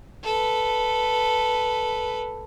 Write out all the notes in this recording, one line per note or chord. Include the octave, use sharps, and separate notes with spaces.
A4 B4